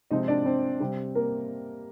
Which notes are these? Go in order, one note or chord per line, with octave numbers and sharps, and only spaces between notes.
C3 F3 G#3 C4 D#4 D#5
D4 D5
C4 C5
C3 G3 C4
A#3 A#4